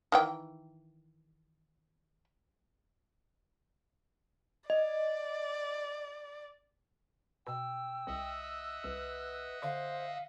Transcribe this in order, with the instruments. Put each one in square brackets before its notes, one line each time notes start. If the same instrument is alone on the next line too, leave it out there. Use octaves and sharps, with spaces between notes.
[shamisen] D#3 E3 G5
[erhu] D5 [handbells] D#5
[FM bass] B2 [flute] G5 [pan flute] E6
[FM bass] C2 [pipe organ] D#5 E5 F#5
[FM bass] C2 [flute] B4
[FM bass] D3 [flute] C5 [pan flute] F5